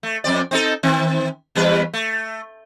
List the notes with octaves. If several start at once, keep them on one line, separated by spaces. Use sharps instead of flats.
A3
F2 C4 D5
C4 D#4 A4
D#3 C4
E2 G3 B4
A3